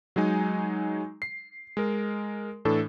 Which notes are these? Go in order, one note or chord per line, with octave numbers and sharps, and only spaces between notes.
F#3 G#3 D#4 G#5
C7
G#3 A#4
A2 E3 D4 A4